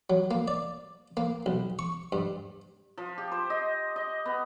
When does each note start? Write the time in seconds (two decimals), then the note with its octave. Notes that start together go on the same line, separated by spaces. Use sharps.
0.10 F#3
0.31 A#3
0.48 D5
1.17 A#3
1.46 B1
1.79 C#6
2.12 G2
2.97 F3
3.18 G4
3.32 C5
3.50 D#5
3.96 D#5
4.25 B3